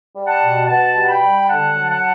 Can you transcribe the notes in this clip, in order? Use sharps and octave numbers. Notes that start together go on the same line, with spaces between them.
G3
F#5 A5
B2
B2 F#5 A5
G3
G5 B5
G3
D3 F#5 A5
F#3
F#5 A5